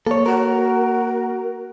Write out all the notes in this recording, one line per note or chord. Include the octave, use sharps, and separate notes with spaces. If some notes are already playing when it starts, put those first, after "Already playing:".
A#3 A4 C#5
F#4 A#4